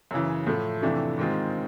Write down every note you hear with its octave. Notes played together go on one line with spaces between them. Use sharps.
F#2 C#3 E3
A2 F3 A3
F2 C3 E3 A3 D4
G#2 D#3 G#3 C4 F4